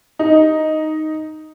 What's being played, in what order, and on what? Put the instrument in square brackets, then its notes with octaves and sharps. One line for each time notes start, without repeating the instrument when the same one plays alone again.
[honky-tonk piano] D#4